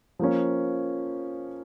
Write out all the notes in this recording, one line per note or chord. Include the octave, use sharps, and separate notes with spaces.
F3 A#3 C#4